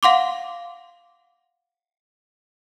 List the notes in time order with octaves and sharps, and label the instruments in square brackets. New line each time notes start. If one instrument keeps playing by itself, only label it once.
[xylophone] F5 F#5 C6 D6